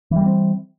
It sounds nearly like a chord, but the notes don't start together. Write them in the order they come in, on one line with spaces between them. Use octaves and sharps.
E3 G3 A#3 C4